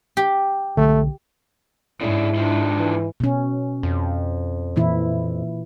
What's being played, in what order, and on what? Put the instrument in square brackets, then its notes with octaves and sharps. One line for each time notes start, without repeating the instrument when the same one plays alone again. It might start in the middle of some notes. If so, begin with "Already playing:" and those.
[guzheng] G4
[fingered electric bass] B1 D3 D4 [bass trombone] A3
[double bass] G#2 [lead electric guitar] C#3 D4 [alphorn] E4
[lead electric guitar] D#3 F3 [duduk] D4
[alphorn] E3
[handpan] B2 C#4
[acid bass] F2
[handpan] A#2 E3 E4